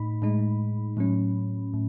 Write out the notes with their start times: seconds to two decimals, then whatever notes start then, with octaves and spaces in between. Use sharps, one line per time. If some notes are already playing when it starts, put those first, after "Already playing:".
Already playing: A2 D#4 B5
0.22 A2 G#3 D#4
0.97 A2 F#3 C#4
1.74 A2